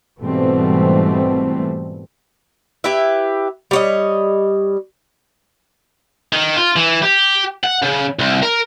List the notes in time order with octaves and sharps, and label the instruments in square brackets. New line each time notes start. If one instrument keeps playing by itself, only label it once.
[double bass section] G#2 B2 E3 G3 A3 C4
[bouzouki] E4 G4 B4 E5
G3 C#5 D#5
[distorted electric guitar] D#3
F4
E3
G4
F#5
C#3
C2
A#4